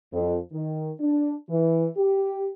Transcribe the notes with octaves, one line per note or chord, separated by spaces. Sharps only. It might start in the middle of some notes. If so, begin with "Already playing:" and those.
F2
D#3
D4
E3
G4